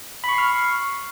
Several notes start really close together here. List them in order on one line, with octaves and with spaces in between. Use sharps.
B5 C#6 C7 F6